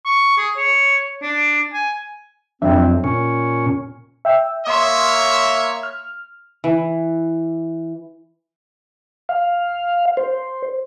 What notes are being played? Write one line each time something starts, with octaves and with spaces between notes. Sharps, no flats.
C#6
G#4
C#5
D4
G#5
F2 F#3 C4 D4 E5
A#2 C#4
E5 G5 E6
A#3 C#5 E5 C6 D#6
F6
E3
F5
C5